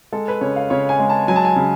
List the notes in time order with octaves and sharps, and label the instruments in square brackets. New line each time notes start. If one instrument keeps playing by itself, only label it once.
[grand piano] G#3 A4
B4
C#3 C#5
F5
C#3 C#5
G#5
G#3
A5
F#3 G#5
A5
G#5
C#3